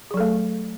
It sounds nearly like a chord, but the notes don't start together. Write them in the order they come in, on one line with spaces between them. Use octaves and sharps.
G#4 F#3 A4 A3